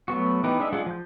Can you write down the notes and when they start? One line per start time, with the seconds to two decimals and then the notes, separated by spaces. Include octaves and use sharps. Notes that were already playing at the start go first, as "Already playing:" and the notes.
0.08 F#3 A3 B3 F#4
0.44 E3 B3 D#4 G4 B4
0.59 G#3 D4 D#4 E5
0.73 G#3 D4 F4 G#4 F#5
0.86 F3 G6